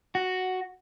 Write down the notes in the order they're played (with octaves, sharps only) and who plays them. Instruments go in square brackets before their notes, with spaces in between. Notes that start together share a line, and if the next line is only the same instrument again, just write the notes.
[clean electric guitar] F#4